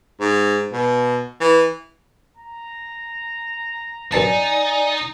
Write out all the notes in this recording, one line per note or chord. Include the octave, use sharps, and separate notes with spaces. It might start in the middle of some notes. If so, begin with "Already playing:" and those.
G#2
B2
E3
A#5
F#2 C4 D#4 D5 G#5 A5